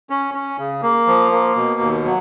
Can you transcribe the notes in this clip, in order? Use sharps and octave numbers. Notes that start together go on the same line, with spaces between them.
C#4
C#4
C#3
A#3
F3
A#3
B2
D#2
F#3